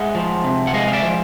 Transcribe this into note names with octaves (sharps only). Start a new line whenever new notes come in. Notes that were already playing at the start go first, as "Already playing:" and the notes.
Already playing: G#3 E5 F#5
F3
C3
F#5
G#3 D#5 F5
F5
D5 E5
F3